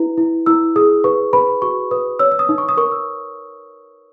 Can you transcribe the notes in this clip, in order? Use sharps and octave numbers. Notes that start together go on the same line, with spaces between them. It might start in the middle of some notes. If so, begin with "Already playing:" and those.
Already playing: E4 B4
E4
E4 E6
G#4 D#6
B4 C#6
B4 B5
F#4 C#6
B4 D#6
C#5 E6
E6
D#6
D#4
C#6
D#6
A#4 C#6
E6